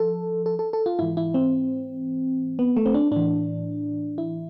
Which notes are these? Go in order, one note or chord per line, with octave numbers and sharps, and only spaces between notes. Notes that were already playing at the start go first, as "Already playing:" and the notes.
Already playing: F3 A4
A4
A4
A4
F4
G#2 E3 E4
E4
C4
B3
A3
C4
D4
A2 E3 D4
E4